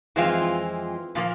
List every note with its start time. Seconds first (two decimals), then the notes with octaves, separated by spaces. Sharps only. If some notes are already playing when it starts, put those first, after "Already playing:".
0.16 F2 E3 G#3 C4 F4
1.15 A#2 F3 A#3